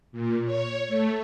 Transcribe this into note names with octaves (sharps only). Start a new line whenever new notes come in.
A#2
C#5
A3